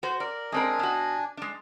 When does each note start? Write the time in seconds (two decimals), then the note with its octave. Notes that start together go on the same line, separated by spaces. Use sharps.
0.03 F#4 C5
0.20 A#4 D5
0.52 G#3 C4 D4 A#4 G#5
0.79 B2 F#4
1.37 G#3 D4